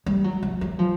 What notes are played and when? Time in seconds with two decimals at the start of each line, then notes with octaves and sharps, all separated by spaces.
0.06 G3
0.24 F#3
0.43 F#3
0.61 F#3
0.79 F3